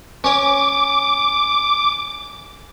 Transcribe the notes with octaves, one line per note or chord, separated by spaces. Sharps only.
C#4 C#5 D6